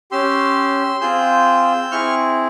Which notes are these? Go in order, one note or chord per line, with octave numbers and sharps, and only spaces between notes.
C#4 G4 C6 E6
C4 F4 G#4 E6 G6
C4 E4 G#4 C#6 F6